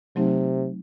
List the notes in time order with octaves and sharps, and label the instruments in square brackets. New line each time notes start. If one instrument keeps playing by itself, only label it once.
[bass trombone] C3 [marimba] F#3 A3 C4 D#4